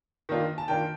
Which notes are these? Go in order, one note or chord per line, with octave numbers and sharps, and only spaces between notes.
D#3 A#3 D4 F4
A5
D#3 A#3 D4 F4 G5